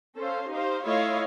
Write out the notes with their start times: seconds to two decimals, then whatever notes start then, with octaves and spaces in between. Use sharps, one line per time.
0.17 C#4 A4 C5 F5
0.50 D#4 G4 C5 F5
0.85 A3 E4 F4 C#5 D#5 F5